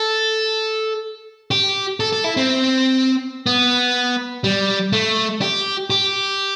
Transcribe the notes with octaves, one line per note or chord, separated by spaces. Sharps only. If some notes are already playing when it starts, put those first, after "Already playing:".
Already playing: A4
G4
A4
A4
E4
C4
B3
G3
A3
G4
G4